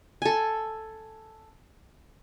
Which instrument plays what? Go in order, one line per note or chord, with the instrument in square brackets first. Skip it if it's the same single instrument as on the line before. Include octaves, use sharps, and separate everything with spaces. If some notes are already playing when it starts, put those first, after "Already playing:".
[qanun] A4 G#5